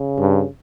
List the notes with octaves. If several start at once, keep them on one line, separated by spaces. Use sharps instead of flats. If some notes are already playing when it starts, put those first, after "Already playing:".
Already playing: C#3
G2